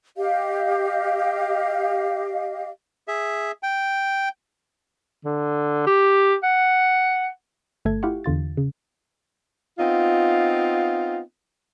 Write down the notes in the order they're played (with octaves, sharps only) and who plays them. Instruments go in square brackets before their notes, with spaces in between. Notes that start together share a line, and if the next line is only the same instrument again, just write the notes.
[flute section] G4 D#5 F5
[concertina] G#4 E5
G5
[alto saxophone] D3
G4
F#5
[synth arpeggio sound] G1 A3 A4 G#6
E4 F4 G4 F5 F#5 C#6
E2 D3 F4 A6
C#3
[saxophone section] B3 C4 D#4 F4